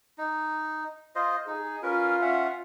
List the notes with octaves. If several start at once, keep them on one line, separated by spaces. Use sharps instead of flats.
D#4
F4 C5 D#5
D#4 G#4
C#4 F4 A#4 B4
C#4 E5 F#5